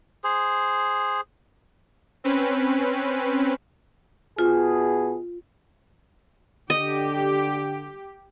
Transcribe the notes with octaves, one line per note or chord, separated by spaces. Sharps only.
G#4 C5
C4 C#4 B4
B2 F4 G#4
D3 G4 D#5